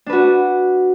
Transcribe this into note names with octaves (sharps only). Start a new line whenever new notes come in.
D4 F#4 B4